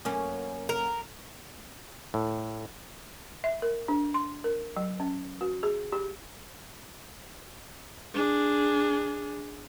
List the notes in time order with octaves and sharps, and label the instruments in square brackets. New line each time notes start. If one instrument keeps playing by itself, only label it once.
[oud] F#2 A#3 C#4
[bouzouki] A#4
[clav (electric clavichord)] A2
[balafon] E5
A#4
D4
C6
A#4
F#3
C#4
F#4
G#4
G4
[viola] D4 G#4